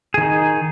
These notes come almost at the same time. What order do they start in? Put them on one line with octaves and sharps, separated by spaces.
G#4 D#3 D#4